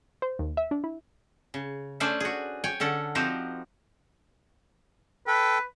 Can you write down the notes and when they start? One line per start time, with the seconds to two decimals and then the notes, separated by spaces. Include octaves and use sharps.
0.22 C5
0.39 D#2
0.57 E5
0.71 D4
0.84 E4
1.54 C#3
2.00 A3 C#4 D4 C5 D5 G#5
2.20 F#4 G#4
2.64 C#5 G5 G#5
2.80 D3 C#4 A4 F#5
3.15 F3 C4 D#4 F#4 G4 C5
5.27 A4 B4 G5